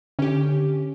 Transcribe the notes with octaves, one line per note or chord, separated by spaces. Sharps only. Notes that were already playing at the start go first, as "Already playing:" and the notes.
D3 C#4 G4